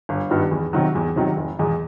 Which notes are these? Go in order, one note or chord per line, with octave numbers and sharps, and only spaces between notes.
G1
G2 D#3 G3 B3
E2
C3 D#3 F#3
E2
C3 D#3 F#3
F1
E2 B2 G#3